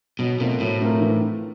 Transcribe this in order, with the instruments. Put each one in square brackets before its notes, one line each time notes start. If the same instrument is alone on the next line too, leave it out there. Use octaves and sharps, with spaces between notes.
[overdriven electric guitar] B2 [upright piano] F#3
[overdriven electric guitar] B2 [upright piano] A3 C4 F4 A#4
[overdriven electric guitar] A2 [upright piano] F#3
[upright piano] A3 C4 F4 A#4
E3